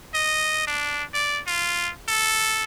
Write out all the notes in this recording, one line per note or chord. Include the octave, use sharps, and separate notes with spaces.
D#5
D4
D5
F4
A4